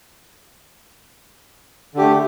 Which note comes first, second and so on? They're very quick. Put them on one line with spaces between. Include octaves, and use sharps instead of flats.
D3 G4 A3